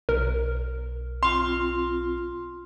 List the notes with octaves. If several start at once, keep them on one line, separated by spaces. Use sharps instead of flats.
B1 A#4
C4 F4 C6